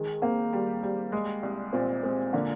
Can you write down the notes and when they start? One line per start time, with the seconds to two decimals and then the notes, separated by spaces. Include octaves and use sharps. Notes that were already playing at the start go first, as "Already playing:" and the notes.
Already playing: D#3 G#3
0.22 A#3 C4
0.53 G3
0.83 G3
1.12 G#3
1.43 C2
1.73 A#2 C4
2.03 G#3 C4
2.33 D3 A#3